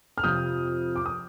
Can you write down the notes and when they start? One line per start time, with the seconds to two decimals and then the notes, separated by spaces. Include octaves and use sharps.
0.18 F6
0.23 F2 C3 F3 D#6 G6
0.96 D6
1.06 D#6